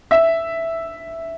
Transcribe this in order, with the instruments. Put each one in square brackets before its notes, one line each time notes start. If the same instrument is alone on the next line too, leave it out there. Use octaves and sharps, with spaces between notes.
[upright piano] E5